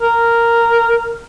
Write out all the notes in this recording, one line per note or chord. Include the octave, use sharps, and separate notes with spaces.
A#4